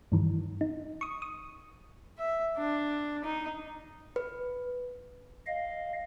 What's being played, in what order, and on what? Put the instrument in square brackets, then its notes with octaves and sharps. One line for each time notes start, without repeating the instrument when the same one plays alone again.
[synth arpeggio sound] G2 D#3 E3
D#4
C#6 D#6
D#6
[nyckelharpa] E5
D4
D#4
[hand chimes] B4
[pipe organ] D#5 F5